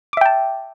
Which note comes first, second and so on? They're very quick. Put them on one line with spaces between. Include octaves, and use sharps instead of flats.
D6 E5 G5 A5